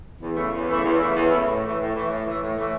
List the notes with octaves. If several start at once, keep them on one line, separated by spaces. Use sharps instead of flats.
E2
C#3 E3 A3 E4
E2
C#3 E3 A3 E4
E2
C#3 E3 A3 E4
E2
C#3 E3 A3 E4
A2
E3 A3
A2
E3 A3
A2
E3 A3
A2
E3 A3